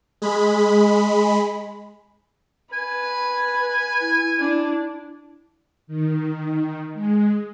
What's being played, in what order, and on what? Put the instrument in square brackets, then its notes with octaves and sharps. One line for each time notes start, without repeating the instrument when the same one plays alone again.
[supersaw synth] G#3 B5
[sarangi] B4 [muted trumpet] G#5
[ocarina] E4
[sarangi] D4
[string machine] D#3
G#3